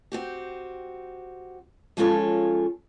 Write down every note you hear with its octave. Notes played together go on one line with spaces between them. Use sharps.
C4 F#4 G4
F3 G#3 C#4 F4 A4 C#5